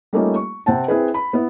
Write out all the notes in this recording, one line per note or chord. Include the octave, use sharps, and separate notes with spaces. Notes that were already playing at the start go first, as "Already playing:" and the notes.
G3 A3 A#3 C#4 D#4 F4
C#6
C3 C4 F#5 A5
C4 E4 G#4 B4
B5
B3 E4